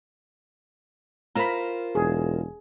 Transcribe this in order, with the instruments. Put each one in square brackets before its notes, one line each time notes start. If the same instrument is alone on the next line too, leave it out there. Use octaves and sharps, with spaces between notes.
[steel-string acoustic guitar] F4 A#4 C5 [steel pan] A#5 B5
[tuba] E1 [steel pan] G#4